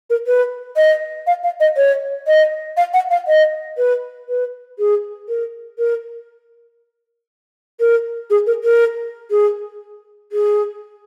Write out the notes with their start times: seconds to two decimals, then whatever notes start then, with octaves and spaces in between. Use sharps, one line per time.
0.10 A#4
0.27 B4
0.77 D#5
1.27 F5
1.43 F5
1.60 D#5
1.77 C#5
2.27 D#5
2.77 F5
2.94 F#5
3.11 F5
3.28 D#5
3.78 B4
4.29 B4
4.79 G#4
5.28 A#4
5.79 A#4
7.80 A#4
8.30 G#4
8.47 A#4
8.64 A#4
9.31 G#4
10.32 G#4